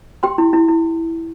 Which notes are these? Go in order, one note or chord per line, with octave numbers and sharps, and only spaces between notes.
G4 G5 C6
E4
E4
E4